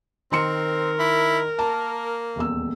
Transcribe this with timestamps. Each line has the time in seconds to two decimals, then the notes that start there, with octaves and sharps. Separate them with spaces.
0.32 D#3 C4 A#4 C6 C#7
0.99 E4
1.59 A#3 A5
2.36 D#1 E2 E6